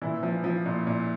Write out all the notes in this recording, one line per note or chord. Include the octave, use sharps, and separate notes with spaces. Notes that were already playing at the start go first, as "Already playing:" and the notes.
A#2 E3 E4
F3
F3
A#2
A#2